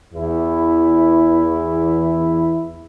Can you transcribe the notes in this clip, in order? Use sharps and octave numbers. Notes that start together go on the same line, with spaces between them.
E2 E4